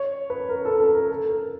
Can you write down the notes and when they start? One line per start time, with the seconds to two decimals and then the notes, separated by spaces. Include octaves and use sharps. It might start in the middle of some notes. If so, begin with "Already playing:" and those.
Already playing: C#5
0.30 B4
0.49 A#4
0.65 A4
0.80 A4
0.95 A#4
1.10 A4
1.30 A#4